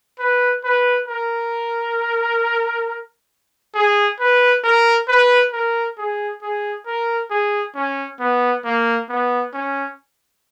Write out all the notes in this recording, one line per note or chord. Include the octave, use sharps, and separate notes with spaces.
B4
B4
A#4
G#4
B4
A#4
B4
A#4
G#4
G#4
A#4
G#4
C#4
B3
A#3
B3
C#4